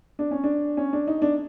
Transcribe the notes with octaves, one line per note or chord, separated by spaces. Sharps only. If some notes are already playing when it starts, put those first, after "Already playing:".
D4
C#4
D4
C#4
D4
D#4
D4